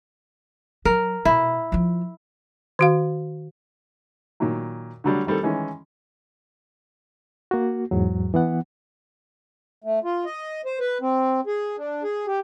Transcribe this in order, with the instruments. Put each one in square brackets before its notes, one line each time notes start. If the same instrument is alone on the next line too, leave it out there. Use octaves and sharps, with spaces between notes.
[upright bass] F#3 [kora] A#4
[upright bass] B2 [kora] E4
[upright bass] F3 F4
[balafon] D#3 F#4 F5
[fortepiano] A#2 D#3 F#3
D3 F#3 G3 D4
D#3 G3 C4 A4
D#3 E3 G#3 C#4
[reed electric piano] A#3 F#4
E2 G#2 F#3
E3 B3 F#5
[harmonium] A3
F4
D#5
C5
B4
C4
G#4
D4
G#4
G4